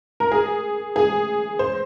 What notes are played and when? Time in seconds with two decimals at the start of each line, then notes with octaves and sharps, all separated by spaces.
0.20 A#4
0.32 G#4
0.96 G#4
1.59 C5